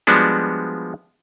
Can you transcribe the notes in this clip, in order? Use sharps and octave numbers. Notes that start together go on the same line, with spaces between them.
F3 G3 G#3 B3 D4 F#4